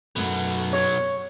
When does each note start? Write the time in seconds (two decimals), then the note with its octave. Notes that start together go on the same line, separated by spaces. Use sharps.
0.16 F#2 B2 F#3 A3 B3
0.73 C#5